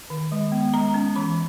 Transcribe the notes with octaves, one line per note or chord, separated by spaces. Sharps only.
D#3
G#3
B3
G#3 A#5
C#4
E3 B5